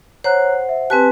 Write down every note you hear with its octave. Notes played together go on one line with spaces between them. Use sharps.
C5 C#5 F#5 A#5 F#6
E5
C4 G4 B4 G#5 A5 F#6